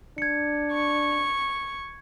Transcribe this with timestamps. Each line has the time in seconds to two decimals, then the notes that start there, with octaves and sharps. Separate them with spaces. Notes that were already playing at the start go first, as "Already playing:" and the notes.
0.18 D4 G#6 C#7
0.72 C#6